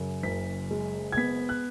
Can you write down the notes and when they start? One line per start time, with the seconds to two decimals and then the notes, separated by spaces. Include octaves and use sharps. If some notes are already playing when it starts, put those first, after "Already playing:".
Already playing: F#2 C#3
0.23 F#1 B6
0.71 G#3
1.12 G#6
1.17 B3 B6
1.49 F#6